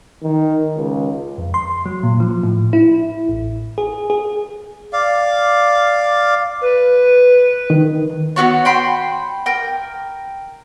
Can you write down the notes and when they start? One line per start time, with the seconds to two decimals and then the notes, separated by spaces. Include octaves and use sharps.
0.23 D#3
0.76 C#2
1.38 F2
1.54 C6
1.86 F#3
2.03 A#2
2.20 F3
2.43 A2
2.73 E4
3.29 A1
3.78 G#4
4.10 G#4
4.93 D5 F5
6.61 B4
7.70 D#3
8.36 B3 C4 F#4 C#5
8.65 G5 B5 C6
9.46 A#4 G5